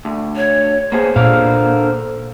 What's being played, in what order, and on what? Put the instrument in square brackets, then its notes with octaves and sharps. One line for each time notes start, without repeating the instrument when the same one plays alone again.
[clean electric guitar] D2
[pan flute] C#5
[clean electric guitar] A#3 B3 G#4 [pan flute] C5
[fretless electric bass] A#2 [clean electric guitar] D3 A#4 F5